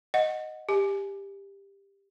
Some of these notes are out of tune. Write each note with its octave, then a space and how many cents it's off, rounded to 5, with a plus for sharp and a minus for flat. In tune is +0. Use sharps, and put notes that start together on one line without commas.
D#5 +0 F#5 +0
G4 +15 G#5 +25